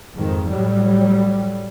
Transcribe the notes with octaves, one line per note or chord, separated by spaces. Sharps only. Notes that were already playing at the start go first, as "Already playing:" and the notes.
F2 G#2 D#3
A2 F#3 G3